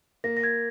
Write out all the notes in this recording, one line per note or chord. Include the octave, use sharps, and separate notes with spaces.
A#3 A#6
A#6
G#6